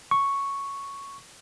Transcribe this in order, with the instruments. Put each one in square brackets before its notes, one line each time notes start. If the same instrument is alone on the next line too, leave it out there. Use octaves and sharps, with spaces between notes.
[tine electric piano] C#6